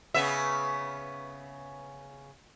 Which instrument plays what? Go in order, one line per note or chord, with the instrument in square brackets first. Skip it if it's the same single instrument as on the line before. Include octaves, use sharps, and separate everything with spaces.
[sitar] C#3 B3 E5